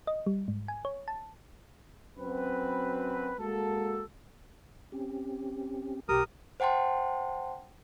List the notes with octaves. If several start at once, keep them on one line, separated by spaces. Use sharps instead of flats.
D#5
G3
G#2
G#5
C#5
A5
F#2 C4 B4
G#3 A#3 F#4 A4
C4 C#4 G4
B1 G4 A#4 D#6
C5 F#5 G5 A5 C6